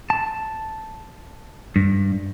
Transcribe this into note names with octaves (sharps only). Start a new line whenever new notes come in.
A5
G2